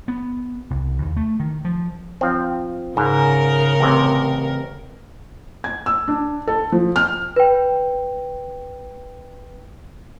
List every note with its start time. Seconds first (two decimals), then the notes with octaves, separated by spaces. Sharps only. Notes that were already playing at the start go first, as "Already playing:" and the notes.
0.08 B3
0.70 C2
1.02 D#2
1.17 A3
1.40 D#3
1.65 F3
2.21 F3 C4
2.97 G#2 C#3 A#4
3.80 A1 C3
5.64 G#6
5.86 E6
6.08 D4
6.47 A4
6.72 F3
6.96 F6
7.36 B4 G5